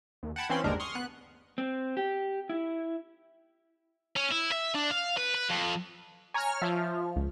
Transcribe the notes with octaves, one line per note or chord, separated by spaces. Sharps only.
D#2
F#5 G5 A5 B5 G#6
E3 C4 C#4 F5 B5 C6
G1 D#2 G3 G#3 D4 A#4
C6 C#6 D#6 F6
B3 F#6
C4
G4
E4
C#4
E4
E5
D4
F5
B4
B4
F2
C#5 G#5 A#5 F6
F3 E5 A5
C#2